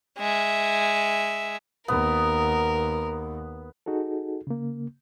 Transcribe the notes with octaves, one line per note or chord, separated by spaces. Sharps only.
G#3 E5
D#2 B3 A#4
D#4 F#4 G#4 A4
C#3 A#3